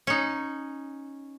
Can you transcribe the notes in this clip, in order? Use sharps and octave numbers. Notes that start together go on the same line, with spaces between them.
C#4 D#4